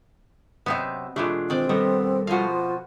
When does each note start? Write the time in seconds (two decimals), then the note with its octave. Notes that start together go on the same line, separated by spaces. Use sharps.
0.66 F#2 C3 B3 C4 D#4 E5
1.16 B2 E3 G#3 A3 D4 F4 G4
1.50 D#3 C4 D5
1.69 D#3 G3 B3 A4 A#4
2.27 F2 B2 F3 F4 F#4 F5